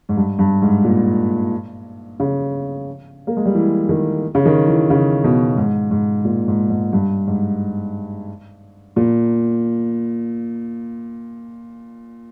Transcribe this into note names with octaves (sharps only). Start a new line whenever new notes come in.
G#2
G2
G2
G#2
A#2
C#3
A#3
G#3
G3
E3
D#3
C#3
D#3
E3
C#3
B2
G#2
G#2
A#2
G#2
G#2
G2
G#2
A#2